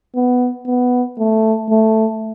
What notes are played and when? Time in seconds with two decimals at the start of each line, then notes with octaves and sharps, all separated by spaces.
0.15 B3
0.67 B3
1.18 A3
1.70 A3